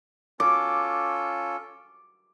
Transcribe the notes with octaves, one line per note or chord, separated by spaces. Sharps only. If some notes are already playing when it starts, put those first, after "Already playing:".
C#4 F4 A4 D6